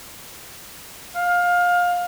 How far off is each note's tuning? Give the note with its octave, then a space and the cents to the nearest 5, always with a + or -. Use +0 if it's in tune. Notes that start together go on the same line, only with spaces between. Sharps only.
F5 +20